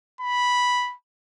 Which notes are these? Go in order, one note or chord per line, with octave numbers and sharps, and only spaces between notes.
B5